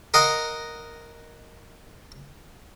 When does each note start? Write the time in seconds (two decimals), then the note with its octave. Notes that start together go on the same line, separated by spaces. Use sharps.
0.14 A#4 D#5 F5 F#5